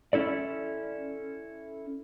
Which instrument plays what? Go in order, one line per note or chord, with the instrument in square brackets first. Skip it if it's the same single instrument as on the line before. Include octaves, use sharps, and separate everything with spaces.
[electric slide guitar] C#4 E4 A4 D5